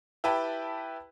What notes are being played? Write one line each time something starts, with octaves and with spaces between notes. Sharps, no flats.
E4 G4 B4 G5 A5